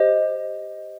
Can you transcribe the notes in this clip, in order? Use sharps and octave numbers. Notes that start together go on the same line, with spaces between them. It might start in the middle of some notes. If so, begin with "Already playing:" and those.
Already playing: G4 C5 D#5